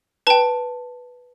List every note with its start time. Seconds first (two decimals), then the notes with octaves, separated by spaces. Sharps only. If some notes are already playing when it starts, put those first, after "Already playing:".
0.27 B4 G5 A5